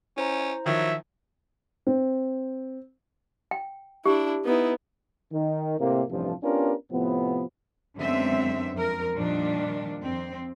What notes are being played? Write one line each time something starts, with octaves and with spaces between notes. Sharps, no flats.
C#4 E4 C5 A#5
D#3 F3 F#3 E5
C4
G5
D4 E4 G4
B3 D#4 E4
D#3
A2 C3 A#3
A1 G2 C3 F3
B3 C#4 D4 F4 G4 A#4
A2 C3 F3 B3
F#2 D3 G#3 B3 C4 E5
F2 A#4
A#2 D#3 F3 G3 D4
F2 C4